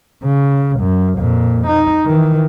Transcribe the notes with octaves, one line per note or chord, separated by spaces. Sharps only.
C#3
F#2
F2 A#2
D#4
D#3 E3